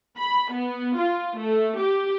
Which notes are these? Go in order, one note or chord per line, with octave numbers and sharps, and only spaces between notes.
B5
B3
F4
A3
G4